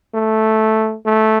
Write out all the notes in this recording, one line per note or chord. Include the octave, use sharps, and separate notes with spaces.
A3
A3